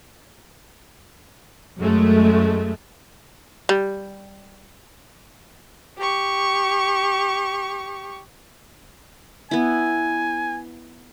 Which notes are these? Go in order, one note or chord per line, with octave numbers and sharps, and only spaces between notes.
F#2 G#3 A3
G3
G4 C#6
B3 E4 G#5